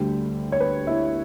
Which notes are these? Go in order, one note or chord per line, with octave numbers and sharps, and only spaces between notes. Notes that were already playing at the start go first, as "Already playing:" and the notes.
Already playing: D2 D3 G3
C#5
B4
E4